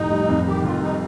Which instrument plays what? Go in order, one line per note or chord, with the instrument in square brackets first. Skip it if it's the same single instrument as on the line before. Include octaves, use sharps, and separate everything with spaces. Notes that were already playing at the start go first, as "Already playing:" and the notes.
Already playing: [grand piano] F1 A2 [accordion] D#4
[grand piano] G3
F2
[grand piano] D#3 [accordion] G4
[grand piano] F1 [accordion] F4
[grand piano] G3 [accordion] D#4